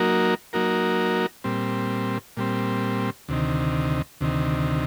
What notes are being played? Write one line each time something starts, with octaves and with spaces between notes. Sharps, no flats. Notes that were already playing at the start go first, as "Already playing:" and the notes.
Already playing: F#3 A#3 D#4 F#4 A#4
F#3 A#3 D#4 F#4 A#4
A#2 G3 C4
A#2 G3 C4
D2 C3 D#3
D2 C3 D#3